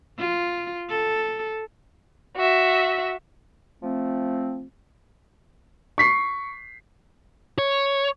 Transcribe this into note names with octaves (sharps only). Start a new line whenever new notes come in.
F4
A4
F#4 E5
F3 A3 C4
C#6 B6 C7
C#5